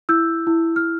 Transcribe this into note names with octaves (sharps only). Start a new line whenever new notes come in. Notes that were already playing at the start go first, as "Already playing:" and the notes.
E4 E6 G6
E4
F6